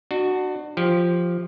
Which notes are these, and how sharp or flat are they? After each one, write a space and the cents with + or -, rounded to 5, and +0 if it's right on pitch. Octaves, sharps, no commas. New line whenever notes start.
D4 +35 F#4 +0
F3 +0 G4 +0